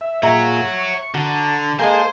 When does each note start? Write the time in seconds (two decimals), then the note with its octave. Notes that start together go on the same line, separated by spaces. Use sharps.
0.01 E5
0.23 A#2 F4 G#4 C#5 E5 F#5 A#5
0.73 C#6
1.14 D3 F#4 A#5
1.79 G#3 A#3 G#4 A4 C5 G#5 C6